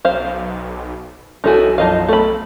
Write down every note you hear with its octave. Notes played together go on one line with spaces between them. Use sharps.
B1 C5 F5
B1 C#4 D#4 E4 F#4 A4 G#5
F#2 F3 D#4 D#5 F5 A5
A3 A4 B5